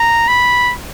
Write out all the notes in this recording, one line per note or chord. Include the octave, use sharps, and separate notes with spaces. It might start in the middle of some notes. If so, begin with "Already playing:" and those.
Already playing: A#5
B5